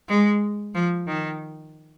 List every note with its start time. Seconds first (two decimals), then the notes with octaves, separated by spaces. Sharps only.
0.08 G#3
0.74 F3
1.07 D#3